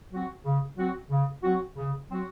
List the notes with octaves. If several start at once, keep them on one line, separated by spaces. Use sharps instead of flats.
F#3 C4 F#4
C#3
F#3 C4 F#4
C#3
F#3 C4 F#4
C#3
F#3 C4 F#4